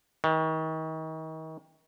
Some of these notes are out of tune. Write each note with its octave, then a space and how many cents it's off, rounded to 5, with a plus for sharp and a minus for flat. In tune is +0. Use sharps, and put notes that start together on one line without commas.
D#3 +35